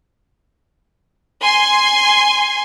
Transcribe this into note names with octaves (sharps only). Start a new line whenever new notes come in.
G#5 C6